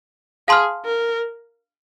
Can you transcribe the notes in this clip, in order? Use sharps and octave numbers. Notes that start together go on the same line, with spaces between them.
G#4 F5 A5 C6 F6
A#4